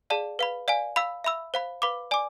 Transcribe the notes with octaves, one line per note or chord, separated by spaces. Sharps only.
G#4 D5 F5 A5
B4 F5 B5
D5 F5 G#5
F5 B5 E6
E5 B5 E6
C5 F5 B5
B4 F5 B5 D6
D5 G#5 D6